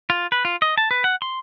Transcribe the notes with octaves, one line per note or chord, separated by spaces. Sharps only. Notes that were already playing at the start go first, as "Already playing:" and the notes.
F4
B4
F4
D#5
A5
B4
F#5
C6